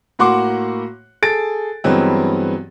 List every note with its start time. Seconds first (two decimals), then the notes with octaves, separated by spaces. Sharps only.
0.19 A2 A#3 F#4 F#5 C6 D6
1.22 G#4 A4 A6 D7
1.84 G2 E3 F#3 G#3 B3 C4